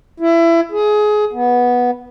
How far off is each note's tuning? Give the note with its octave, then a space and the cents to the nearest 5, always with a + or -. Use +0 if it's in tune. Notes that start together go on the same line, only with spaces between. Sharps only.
E4 +25
G#4 +20
B3 -10